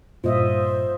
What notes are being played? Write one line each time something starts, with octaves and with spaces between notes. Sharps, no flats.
G2 A#2 F4 C5 D#5 E5